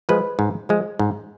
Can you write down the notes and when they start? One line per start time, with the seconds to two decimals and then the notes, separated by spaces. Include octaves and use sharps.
0.09 F3 G#3 B4
0.39 G#2
0.69 F3 G#3
0.99 G#2